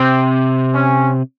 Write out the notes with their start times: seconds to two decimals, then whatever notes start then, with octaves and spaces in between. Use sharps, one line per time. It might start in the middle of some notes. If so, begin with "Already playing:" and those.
Already playing: C3 C4
0.75 C#4